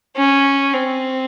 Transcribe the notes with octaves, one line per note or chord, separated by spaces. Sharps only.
C#4
C4